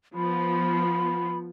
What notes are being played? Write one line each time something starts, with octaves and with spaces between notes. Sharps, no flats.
F3 B3 B5